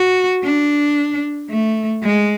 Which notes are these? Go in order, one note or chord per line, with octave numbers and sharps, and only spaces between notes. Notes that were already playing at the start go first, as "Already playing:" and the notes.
Already playing: F#4
D4
A3
G#3